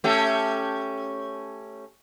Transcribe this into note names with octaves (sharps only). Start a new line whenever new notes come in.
A3 C#4 G4